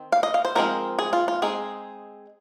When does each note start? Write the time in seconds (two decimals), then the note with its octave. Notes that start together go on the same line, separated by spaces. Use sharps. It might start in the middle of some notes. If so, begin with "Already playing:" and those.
Already playing: D#3 C4
0.12 F5
0.23 D#5
0.34 F5
0.45 C5
0.55 F3 G#3 C4 D#4 A#4
0.99 G#4
1.13 F4
1.28 F4
1.42 G#3 C4 D#4 G#4